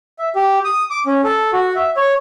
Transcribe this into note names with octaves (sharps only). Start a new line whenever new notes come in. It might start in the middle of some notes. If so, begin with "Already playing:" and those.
E5
G4
D#6
D6
C#4
A4
F#4
E5
C#5